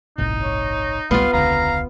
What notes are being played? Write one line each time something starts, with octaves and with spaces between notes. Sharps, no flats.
G1 C2 A2 D#4
C#5
G#1 C#2 G3 B3 F4 F5
E1 C#2 D3 F5 A#5